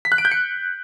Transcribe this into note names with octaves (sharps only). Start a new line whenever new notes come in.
B6
F#6
D7
G6
C#7